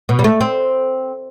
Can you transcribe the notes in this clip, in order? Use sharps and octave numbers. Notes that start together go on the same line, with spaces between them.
B2
G3
A3
C4